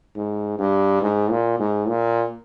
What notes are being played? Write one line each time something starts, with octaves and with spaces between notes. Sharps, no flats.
G#2
G2
G#2
A#2
G#2
A#2